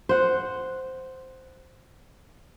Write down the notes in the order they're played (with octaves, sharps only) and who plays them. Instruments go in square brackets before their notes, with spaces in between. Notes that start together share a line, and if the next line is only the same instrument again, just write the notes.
[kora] C5 F#5